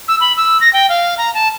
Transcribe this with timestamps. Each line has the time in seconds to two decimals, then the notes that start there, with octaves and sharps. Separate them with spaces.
0.08 E6
0.20 B5
0.37 E6
0.61 A#6
0.73 G5
0.89 F5
1.18 A#5
1.34 A5